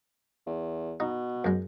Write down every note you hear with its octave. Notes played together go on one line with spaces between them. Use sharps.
E2
B2 D#4
F#2 G#3